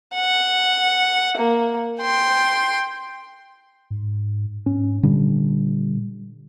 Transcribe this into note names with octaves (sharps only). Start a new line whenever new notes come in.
F#5
A#3
G5 C6
G#2
G#2 C#4
A#2 D3 G3